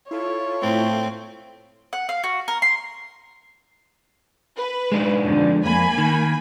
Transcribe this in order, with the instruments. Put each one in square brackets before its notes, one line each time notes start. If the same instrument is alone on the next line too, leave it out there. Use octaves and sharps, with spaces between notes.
[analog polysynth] E4 F4 A4 [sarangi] C#5
[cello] A2 [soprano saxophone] C4
[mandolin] F#5
F5
F#4
A#4
C6
[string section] B4
[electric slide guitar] G#3 D4 D#4
[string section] F2 D3
[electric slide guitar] F2 [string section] A#3 G#5 B5
[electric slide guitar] D#3